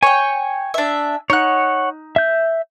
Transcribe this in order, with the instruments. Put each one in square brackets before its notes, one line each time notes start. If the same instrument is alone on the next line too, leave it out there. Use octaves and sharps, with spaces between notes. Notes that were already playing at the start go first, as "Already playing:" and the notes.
[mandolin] C#5 G5 [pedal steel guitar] G#5
[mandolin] D4 E5
[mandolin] D#4 F#6 [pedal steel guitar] C#5 F#5
[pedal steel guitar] E5 G6